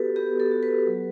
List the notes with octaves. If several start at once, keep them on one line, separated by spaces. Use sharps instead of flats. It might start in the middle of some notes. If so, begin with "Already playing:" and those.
Already playing: B3 F#4 G4 A4 B4
B3 G4
A4
F#4
B4
F#3